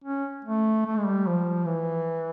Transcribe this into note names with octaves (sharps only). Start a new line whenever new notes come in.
C#4
A3
A3
G#3
G3
F3
E3